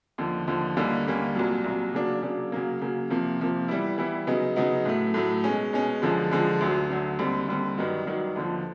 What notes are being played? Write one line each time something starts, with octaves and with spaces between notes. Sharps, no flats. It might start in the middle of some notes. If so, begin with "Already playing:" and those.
D#2 D3 F3
D#2 D3 F3
D#2 D3 G3 A#3 C#4
D#2 D3 G3 A#3 C#4
C2 A#2 F#3
C2 A#2 F#3
C#3 F#3 A#3 D4
C#3 F#3 A#3 D4
C#3 F#3 A#3
C#3 F#3 A#3
C3 F3 A#3
C3 F3 A#3
E3 G3 B3 E4
E3 G3 B3 E4
C#3 F#3 B3 D#4
C#3 F#3 B3 D#4
A2 F#3 A3
A2 F#3 A3
B2 G#3 C#4
B2 G#3 C#4
F#2 D3 F3 G#3
F#2 D3 F3 G#3
D2 D3 F#3
D2 D3 F#3
D#2 D3 G3 C4
D#2 D3 G3 C4
G2 D#3 F#3
G2 D#3 F#3
D#2 D3 F3